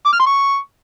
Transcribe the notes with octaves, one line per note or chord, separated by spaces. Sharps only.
D6
F6
C6
C#6